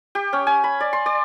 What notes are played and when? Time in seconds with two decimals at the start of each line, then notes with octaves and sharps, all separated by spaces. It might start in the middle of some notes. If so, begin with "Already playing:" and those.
0.15 G4
0.33 C#4
0.47 G#5
0.64 B5
0.81 D5
0.93 C6
1.06 D5